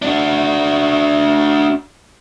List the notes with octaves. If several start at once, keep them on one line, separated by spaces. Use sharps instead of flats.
D4 F#4